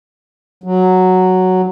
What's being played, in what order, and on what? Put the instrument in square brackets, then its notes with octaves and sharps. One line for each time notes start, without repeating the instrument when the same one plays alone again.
[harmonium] F#3